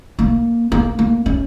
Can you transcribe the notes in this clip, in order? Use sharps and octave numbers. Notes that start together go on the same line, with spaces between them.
A#3
A#3
A#3
C#4